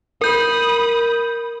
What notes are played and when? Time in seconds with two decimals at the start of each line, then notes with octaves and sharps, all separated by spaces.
0.21 A#4 B5 D#6 G6